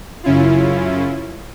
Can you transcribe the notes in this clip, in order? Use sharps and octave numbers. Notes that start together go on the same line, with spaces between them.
F#2 C#3 C#4 E4 F4